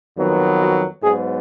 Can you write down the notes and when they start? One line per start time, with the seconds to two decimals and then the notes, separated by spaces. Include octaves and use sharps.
0.17 F2 D#3 F#3 B3
0.60 F#4
1.02 G#2 F#3 B3 G#4